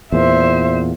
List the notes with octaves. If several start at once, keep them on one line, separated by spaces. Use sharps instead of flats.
E2 A#2 C5 E5